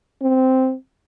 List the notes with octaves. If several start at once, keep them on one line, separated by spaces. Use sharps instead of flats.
C4